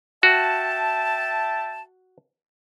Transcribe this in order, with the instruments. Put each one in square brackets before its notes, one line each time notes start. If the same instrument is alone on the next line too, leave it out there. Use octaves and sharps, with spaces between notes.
[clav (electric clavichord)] F#4 [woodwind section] E5 G5 A5